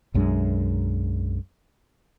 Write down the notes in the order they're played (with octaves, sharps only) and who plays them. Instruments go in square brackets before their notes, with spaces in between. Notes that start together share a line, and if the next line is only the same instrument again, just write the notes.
[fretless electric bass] B1 F#2 G#3 D4